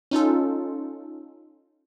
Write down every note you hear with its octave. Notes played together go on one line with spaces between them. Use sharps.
C#4 D#4 F4 A4